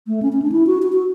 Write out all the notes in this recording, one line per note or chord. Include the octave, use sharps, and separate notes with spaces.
A3
C#4
C#4
D4
E4
F#4
F#4
F#4